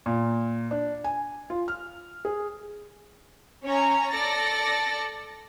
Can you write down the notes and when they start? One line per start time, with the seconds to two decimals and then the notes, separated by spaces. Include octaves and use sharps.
0.06 A#2
0.71 D4
1.04 G#5
1.50 F4
1.68 F6
2.25 G#4
3.64 C#4 C#5 G#5 A#5
4.13 A4 D5 A6 A#6 C#7